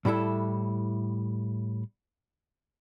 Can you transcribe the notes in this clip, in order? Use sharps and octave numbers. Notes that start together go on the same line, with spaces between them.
A2 G3 E4 A4